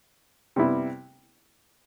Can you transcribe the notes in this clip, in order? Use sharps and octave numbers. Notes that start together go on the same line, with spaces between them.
C3 G3 B3 E4